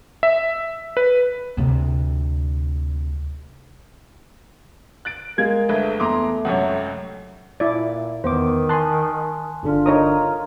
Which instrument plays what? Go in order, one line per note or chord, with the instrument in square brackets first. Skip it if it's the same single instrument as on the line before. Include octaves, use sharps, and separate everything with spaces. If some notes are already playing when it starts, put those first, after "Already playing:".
[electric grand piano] E5
B4
[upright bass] D2 C3
[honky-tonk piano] F#6 A6 D7
[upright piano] G#3 F5 [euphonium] A#4 [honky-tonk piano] G#6
[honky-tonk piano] G1 B4 [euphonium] A3
[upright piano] E2 [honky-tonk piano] A#5 C6 D6
[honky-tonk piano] C#2 F#2 C3 [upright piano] C#5 F#5
[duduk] A#2 [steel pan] E4 D5
[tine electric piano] E2 B3 D6 [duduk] D#3 [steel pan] C5
[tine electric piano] G#5 F#6 [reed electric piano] A5 C6
[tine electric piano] G1 D3 D4 [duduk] F4
[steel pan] D#4 C#5 D#6 [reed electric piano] A#4 A#5